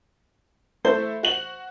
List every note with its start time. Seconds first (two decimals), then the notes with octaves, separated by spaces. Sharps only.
0.85 A3 E4 C5
1.23 F#4 F#7